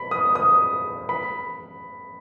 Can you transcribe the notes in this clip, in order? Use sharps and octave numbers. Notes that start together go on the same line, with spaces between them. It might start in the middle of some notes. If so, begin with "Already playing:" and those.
Already playing: B5
D#6
D#6
B5